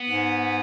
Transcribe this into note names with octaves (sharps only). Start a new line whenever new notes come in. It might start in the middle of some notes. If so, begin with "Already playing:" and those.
Already playing: B3
G#2